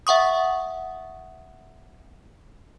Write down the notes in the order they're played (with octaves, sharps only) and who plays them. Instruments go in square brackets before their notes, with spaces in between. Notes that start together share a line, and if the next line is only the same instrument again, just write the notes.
[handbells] E5 F#5 C#6 D#6